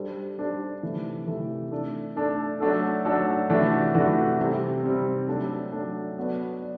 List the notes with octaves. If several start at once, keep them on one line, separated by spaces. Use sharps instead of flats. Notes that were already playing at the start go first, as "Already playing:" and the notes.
Already playing: G3 D4 A4 C5
G3 D4 A4 C5
C3 E3 A3
C3 E3 A3
A3 D4 A4
A3 D4 A4
F#3 A3 D4 F#4 A4
F#3 A3 D4 F#4 A4
C3 E3 A3 D4 F#4
C3 E3 A3 D4 F#4
C3 G3 C4
C3 G3 C4
F#3 A3 D4
F#3 A3 D4
F#3 B3 F#4 B4 D5
D5